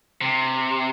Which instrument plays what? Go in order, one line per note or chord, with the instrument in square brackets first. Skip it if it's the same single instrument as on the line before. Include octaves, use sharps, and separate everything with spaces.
[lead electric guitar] C3